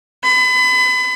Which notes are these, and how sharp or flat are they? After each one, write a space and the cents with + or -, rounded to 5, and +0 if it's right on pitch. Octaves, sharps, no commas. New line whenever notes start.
B5 +35